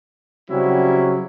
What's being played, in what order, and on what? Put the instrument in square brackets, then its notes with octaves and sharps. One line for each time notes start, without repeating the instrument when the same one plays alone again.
[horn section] C#3 F#3 G3 C4 C#4 E4